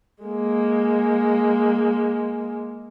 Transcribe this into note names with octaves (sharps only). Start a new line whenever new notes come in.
G#3 A#3